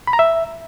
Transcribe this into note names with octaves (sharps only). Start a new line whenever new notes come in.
B5
A#5
E5